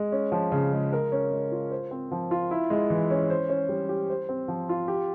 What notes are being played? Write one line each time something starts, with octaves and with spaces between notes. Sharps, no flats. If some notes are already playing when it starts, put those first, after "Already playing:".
Already playing: G#3
C#4
F3
C#3
G#3
A#4
C#4
G#3
F4
C5
C4
F3
F4
E4
G#3
E3
C#4
C5
C#4
G3
G4
C5
C4
F3
F4
G4